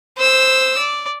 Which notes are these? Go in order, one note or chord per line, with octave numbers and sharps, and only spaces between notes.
C5 E6
D5